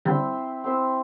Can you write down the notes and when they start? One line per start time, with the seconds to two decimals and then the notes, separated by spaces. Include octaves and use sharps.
0.05 D3 G3 C4 E4 C5 E5
0.64 C4 E4 C5 E5